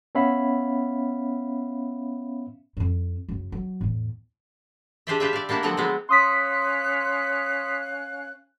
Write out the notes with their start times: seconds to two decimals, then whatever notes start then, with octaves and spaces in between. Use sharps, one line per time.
0.15 B3 C#4 C#5 E5 F5 B5
2.77 F2 E4
3.29 F#2 C#3
3.52 F#3
3.81 E2 A2
5.07 D4 G4 G#4 C5 D5 E5
5.20 F4 G4 B4 E5
5.33 D5 F5
5.49 G3 A#3 B3 D4 E4
5.63 D3 F3 F#3 C4 F#5
5.77 F#3 G#3 B3 C4
6.09 C#4 F5 C6 D#6 F#6 B6